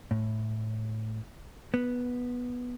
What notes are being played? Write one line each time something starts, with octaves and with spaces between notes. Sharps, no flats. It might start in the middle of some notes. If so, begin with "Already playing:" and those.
A2
B3